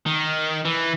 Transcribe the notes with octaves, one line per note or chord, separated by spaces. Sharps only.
D#3
E3